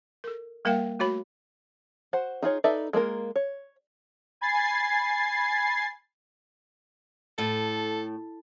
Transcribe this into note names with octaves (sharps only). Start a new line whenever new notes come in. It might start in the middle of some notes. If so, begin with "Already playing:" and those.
A4 A#4
G3 A#3 A#4 E5 F5 G5
A3 F#4 C#5 B5
F#4 C5 F#5
D#4 F4 G#4 C#5
D#4 A4 B4 D5 E5
G#3 A#3 F4 A#4
C#5
G#5 B5 G#6 A6 C7
A2 A4